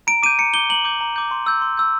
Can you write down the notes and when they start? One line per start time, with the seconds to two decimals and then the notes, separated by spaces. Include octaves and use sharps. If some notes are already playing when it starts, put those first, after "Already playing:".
0.07 A#5 D7
0.23 D6 D#7
0.26 G6
0.39 A#5 C#7
0.54 D6 G6 G7
0.70 A#5 F#7
0.85 D6 G6
1.01 A#5
1.16 D6 G6
1.31 C6
1.46 E6 G6
1.61 C6
1.77 E6 G6